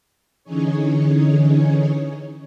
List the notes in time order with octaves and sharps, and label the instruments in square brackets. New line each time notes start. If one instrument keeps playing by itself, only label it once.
[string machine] D3 E3 C#4 D#4 G#4 C#5